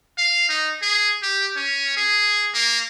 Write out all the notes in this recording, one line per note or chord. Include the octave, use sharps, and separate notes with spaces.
F5
D#4
G#4
G4
C#4
G#4
A#3